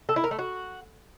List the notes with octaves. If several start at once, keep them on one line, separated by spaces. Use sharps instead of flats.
A4
E4
A#4
A3
F#4